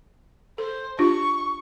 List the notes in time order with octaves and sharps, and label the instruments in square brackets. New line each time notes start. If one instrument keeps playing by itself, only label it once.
[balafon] A4 [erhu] C5
[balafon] D4 F4 G4 [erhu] C#6